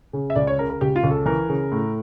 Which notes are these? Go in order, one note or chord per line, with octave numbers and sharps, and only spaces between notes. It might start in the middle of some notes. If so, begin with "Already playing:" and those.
C#3
E5
C#2 D5
C#5
C#3 A#4
A#4
C#2 G4
F4
C#2
A4
E3 A#4
C#3
A2